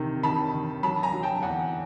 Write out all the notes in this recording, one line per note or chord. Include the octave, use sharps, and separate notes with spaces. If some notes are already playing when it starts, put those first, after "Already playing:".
Already playing: C3 D#3
D#3 A5 B5
D#3
F#3 A5 B5
G#5 A#5
F#3
G5 A5
E2 F#5 G#5